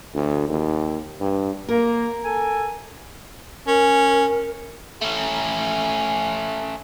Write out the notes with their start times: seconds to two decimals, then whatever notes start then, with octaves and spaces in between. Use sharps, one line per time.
0.14 D2
0.48 D#2
1.20 G2
1.69 A#3 A#4
2.24 A4 G#5
3.67 C#4 A#4
5.02 A3 C#4